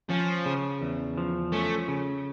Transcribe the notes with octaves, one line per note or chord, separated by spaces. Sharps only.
F3 C#4
C#3
E2
F3
A3 C#4
C#3